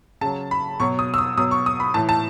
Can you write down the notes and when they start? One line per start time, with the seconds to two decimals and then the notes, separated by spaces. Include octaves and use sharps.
0.21 C#3 A5
0.26 F#3
0.51 B5
0.80 B2 F#3 C#6
0.99 D#6
1.14 E6
1.18 D#6
1.38 B2 F#3 D#6
1.51 C#6
1.66 D#6
1.80 B5
1.94 A2 E3 A5
2.09 A5